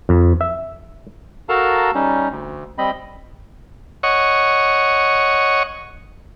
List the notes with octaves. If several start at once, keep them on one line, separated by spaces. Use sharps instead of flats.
F2
E5
F#4 A4 A#4 F5 A5 A#5
G3 C#4 D#4
D2
G3 C4 D#5 B5
C#5 D#5 F#5 C#6